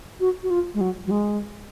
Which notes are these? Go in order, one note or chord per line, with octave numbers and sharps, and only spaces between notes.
F#4
F#4
F4
G#3
F#3
F#3
G#3